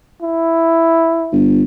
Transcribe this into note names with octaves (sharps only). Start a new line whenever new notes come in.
E4
G1